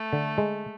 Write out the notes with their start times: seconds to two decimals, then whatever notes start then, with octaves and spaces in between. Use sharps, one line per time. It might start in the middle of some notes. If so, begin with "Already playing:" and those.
Already playing: A3
0.13 D3
0.38 G#3